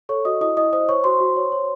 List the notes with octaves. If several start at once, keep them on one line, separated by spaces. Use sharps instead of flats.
A4 C#5 C#6
F#4 D#5 D#6
E4 D#5 D#6
E4 D#5 D#6
C5 D#5 D#6
C5 C#5 C#6
F#4 C5 C6
F#4
C#5
C#5